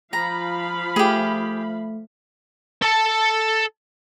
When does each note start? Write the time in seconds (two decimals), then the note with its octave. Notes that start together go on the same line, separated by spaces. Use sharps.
0.13 F3 F5 A#5 B5
0.96 A3 G4 G#4
2.82 A4 A5